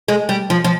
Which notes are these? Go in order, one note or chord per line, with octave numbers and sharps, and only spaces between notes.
G#3
G3
F3
F3